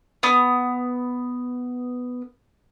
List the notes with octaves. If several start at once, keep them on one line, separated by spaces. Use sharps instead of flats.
B3 D#6